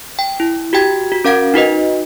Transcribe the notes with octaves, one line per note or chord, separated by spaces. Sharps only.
G5
E4
F#4 G4 G5 G#6
F#4
C#4 A#4 F5 F#5 G#6 D7
D#4 F#4 B4 D#5